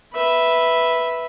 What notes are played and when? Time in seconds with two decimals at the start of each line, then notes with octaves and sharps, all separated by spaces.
0.13 B4 E5